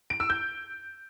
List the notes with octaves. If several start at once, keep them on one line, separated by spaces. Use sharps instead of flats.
D7
E6
G6